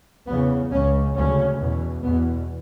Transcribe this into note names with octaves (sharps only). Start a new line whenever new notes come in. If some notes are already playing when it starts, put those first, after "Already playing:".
E2 C#3 B3
C#2 C#3 C#4
D2 C#3 C#4
E2 B2
E2 B2 B3